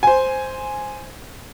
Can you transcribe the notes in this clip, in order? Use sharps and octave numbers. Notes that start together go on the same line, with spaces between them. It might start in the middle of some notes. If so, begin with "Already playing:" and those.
C5 G#5